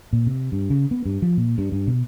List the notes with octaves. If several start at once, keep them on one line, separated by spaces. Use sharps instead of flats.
A#2
C3
G2
C#3
B3
G2
F3
A#2
G2
G2
B2